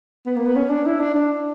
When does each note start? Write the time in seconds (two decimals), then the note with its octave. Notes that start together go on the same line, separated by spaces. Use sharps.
0.26 B3
0.36 A#3
0.45 B3
0.56 C#4
0.70 D4
0.86 E4
1.00 D4
1.15 D4